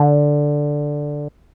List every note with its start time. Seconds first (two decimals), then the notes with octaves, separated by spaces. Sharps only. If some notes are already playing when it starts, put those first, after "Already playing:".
Already playing: D3